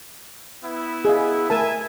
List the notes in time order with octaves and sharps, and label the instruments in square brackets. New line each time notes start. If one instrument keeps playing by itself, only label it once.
[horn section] B3 E4
[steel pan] G#4 D#5 F5
[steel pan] A3 A#4 A5 [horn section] E5 G#5